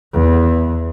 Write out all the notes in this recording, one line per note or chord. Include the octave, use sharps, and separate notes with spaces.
E2